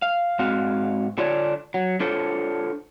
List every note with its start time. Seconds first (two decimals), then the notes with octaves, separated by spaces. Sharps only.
0.02 F5
0.39 G#2 C4 F#4 F5
1.18 D3 D4 F4 C#5 D5
1.74 F#3
2.00 D4 F4 A4 C5 C#5